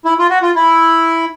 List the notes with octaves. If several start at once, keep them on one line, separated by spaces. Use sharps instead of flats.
E4
F4
F#4
F4
E4